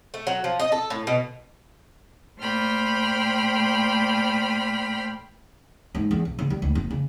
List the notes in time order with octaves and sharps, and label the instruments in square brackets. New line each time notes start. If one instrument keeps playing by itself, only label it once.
[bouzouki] A3
F#3
F3
D#5
A4
A2
B2
[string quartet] A#2 A3 C5 G5 B5 F6
[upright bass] G#2
E2
B1
C#3
G3
D2
F1
C#3